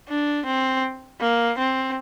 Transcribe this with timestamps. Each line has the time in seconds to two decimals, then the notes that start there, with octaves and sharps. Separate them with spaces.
0.09 D4
0.46 C4
1.21 A#3
1.58 C4